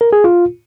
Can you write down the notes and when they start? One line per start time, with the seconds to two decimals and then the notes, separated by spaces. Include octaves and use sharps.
0.01 A#4
0.13 G#4
0.24 F4